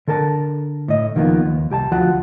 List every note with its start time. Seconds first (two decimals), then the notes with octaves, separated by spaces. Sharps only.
0.07 D3 A4 A#4 A5
0.88 A2 D#5
1.15 C#2 D#3 F3 G3 A#3 B3
1.45 D#2
1.70 C2 G4 G#5 A5
1.91 D2 F3 F4 F#4 F#5